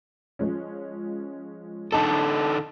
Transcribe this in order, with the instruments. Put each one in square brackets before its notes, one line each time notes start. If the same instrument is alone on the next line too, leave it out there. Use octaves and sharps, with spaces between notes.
[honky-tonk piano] F3 G#3 C#4
[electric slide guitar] D3 D#4 A4 [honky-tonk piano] D#5 A5 B5